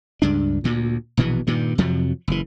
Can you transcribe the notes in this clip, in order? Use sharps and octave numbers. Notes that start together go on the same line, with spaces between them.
C#2 G2 D4
D2 A#2
A#1 B2 E3 B3
G2 A#2 D#3
F2 C3 F3 F#3
F#1 E3